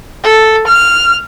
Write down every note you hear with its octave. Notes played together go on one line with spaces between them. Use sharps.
A4
F6